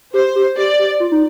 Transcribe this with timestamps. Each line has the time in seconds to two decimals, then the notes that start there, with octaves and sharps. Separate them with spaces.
0.14 G4 C5
0.36 G4
0.57 G4 D5
0.79 G4
1.00 F4
1.12 D#4